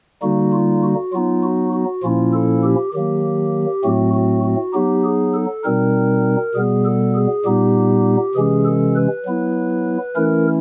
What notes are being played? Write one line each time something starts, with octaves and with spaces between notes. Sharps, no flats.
D3 G3 A#3 D#4 F#4
F4
F#4
F#3 B3 D#4 F4
F#4
F#4
A#2 F3 A#3 C#4 E4 F4
A4
G4
D#3 F#3 A#3 G4
A2 F#3 A3 C4 F#4
F#4
F#4
F#3 B3 D#4 G4
G#4
A4
B2 G3 C4 D#4 A#4
B2 G3 B3 G#4
A4
G#4
A#2 G3 B3 D#4 G4
C3 E3 G#3 C#4 G#4
A4
B4
F#3 B3 E4
E3 A3 C#4 E4 A#4